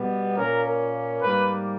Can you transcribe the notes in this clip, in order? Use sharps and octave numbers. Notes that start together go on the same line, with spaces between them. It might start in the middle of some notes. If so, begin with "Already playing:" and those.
Already playing: B2 G3 B3
A#2 A#3 C#4 A#4
G#2 G3 A#3 B4